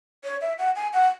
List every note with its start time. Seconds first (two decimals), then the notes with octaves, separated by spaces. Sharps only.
0.24 C#5
0.41 E5
0.58 F#5
0.76 G#5
0.93 F#5